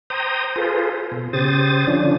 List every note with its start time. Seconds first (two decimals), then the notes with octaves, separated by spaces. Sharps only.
0.10 C5 G5 A#5 D#6
0.56 F4 G#4 A4 B4 C5
1.12 B2
1.33 C#3 G4 C5 D#6 A6
1.87 D3 F3 C#4 D4